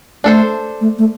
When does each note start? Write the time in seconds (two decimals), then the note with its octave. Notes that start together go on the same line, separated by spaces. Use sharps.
0.24 A3 D4 A4 C5
0.81 A3
0.98 A3